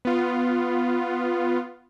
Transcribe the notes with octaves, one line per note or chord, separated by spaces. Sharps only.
B3 F4